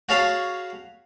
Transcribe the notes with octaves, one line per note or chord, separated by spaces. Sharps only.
F#4 G#4 C#5 F5 A5 B5